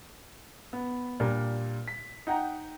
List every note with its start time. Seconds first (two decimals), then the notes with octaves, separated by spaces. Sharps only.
0.73 B3
1.20 A#2 G3 D4 A#4
1.88 B6
2.27 D#4 F#5 G5 A#5